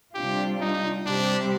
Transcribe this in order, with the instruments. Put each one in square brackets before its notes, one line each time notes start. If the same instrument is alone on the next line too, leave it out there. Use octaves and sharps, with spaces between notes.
[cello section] C3 G3 D4 F4 [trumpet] G4
[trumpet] D#4
[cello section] C3 G3 C4 G4 [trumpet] D4